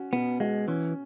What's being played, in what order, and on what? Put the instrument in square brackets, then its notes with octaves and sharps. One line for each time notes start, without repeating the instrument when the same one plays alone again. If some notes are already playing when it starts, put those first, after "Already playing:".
Already playing: [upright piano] C#4 F#4
[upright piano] B2 [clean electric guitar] B3
[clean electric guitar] G#3 [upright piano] F#4
[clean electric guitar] E3 [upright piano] C#4